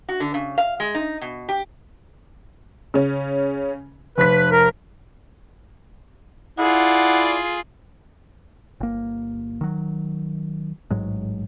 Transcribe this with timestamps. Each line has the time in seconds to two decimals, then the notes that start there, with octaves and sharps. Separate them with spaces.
0.09 F#4
0.20 D3
0.34 C#3
0.58 F5
0.80 G#3
0.95 D#4
1.21 B2
1.49 G4
2.94 C#3 C#4
4.18 F1 B4 B6
4.51 A#4
6.59 E4 F4 G#4 D5 F#5
8.80 G1 A#3
9.61 D#3 F#3
10.91 A1 G#2 F#3 G#3